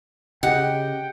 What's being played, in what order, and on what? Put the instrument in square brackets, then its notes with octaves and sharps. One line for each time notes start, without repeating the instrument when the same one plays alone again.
[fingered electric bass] C#3 [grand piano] G4 D#5 [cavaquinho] F#5 [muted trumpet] G5